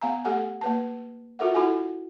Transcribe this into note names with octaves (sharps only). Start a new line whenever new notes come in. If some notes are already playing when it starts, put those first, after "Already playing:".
B3 F5 G#5 A#5
A3 G4 A4 F#5 G#5
A#3 B4 A5
F4 F#4 A4 A#4 E5 F#5
E4 F#4 A4 F#5 G#5